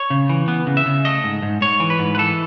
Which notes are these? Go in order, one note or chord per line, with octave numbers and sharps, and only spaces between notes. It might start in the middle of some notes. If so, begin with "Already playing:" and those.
Already playing: C#5
C#3
E3
B3
C#3
E5
C#3
A3 D#5
G#2
G#2
G#2 C#5
E3
B4
G#2
B4
E3 A4